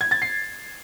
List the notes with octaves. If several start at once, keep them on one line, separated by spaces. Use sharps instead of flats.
G#6
A6
C7